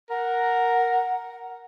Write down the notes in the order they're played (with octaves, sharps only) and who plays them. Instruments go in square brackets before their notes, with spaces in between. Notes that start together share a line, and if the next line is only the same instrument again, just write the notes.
[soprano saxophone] A#4 [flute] F#5